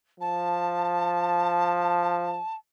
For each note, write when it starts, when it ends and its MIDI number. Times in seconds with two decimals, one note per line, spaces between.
0.20 2.38 53
0.20 2.55 81